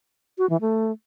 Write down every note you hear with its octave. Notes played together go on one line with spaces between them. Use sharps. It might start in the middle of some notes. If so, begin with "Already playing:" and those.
F#4
E3
A3